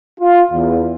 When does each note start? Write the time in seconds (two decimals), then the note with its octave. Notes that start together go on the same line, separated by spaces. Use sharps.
0.19 F4
0.51 E2